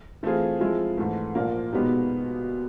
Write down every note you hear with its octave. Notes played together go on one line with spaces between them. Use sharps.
E3 A3 C4 F4 G#4
F3 G#3 C4 E4 G#4
G#2 E3 A3
A#2 F3 A#3
B2 G#3 B3 D#4 G4